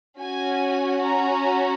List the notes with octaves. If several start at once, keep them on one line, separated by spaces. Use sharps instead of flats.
C#4 F#4 G#5
A#5